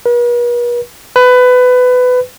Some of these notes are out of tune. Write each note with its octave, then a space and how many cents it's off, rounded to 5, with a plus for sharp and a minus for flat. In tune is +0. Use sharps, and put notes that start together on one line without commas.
B4 -45
B4 +20